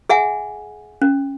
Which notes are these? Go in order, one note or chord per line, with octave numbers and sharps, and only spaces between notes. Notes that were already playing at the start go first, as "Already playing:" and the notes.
G#4 E5 F#5 G#5
C#4